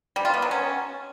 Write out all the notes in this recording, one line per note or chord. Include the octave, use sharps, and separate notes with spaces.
G3
F4
B3
F#3
C#4